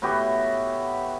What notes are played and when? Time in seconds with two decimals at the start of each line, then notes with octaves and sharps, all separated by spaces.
0.02 A2 B3 F#4 G4